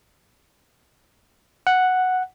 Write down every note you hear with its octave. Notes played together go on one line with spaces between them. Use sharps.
F#5